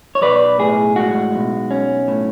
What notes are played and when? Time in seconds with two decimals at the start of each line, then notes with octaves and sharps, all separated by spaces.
0.15 C#5
0.21 B1 B4 D5
0.59 A2 G#4
0.96 G#3 F#4
1.34 B1
1.71 C#4
2.08 A2